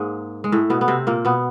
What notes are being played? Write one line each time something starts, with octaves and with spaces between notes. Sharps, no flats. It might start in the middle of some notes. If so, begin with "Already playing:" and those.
Already playing: G#2 G#3 A#3
G#3
A2 A3
B2 B3
B3
C3 C4
A#2 A#3
B2 B3